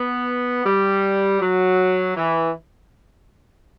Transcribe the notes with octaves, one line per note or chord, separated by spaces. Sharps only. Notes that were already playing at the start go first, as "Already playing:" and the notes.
Already playing: B3
G3
F#3
E3